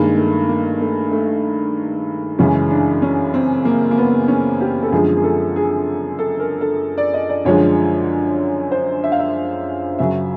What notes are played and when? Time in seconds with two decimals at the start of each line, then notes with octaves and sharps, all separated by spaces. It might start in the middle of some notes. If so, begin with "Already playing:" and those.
Already playing: G2 D#3 G#3 A#3
0.17 A3
0.49 A#3
0.81 A3
1.12 A3
2.39 F#2 C#3 E3 G#3 C#4
2.70 D4
3.02 C#4
3.34 C4
3.65 A#3
3.91 A#3
3.97 B3
4.28 C#4
4.61 G4
4.83 A4
4.92 F#2 D3 F3 G#3 G#4
5.17 G#4
5.24 A4
5.56 G#4
6.19 A4
6.40 A#4
6.61 A4
6.98 D5
7.14 D#5
7.29 D5
7.45 F#2 D3 F3 G#3 C#5
8.72 C5
9.04 E5
9.12 F5
9.19 E5
9.99 F#2 C#3 F#3 E5